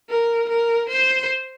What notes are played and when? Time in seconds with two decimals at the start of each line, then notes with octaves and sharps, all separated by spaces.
0.10 A#4
0.50 A#4
0.90 C5